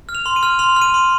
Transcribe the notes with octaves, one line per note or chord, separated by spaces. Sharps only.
F6
F7
C6
D#7
F6
C6 F7
F6
D#7
C6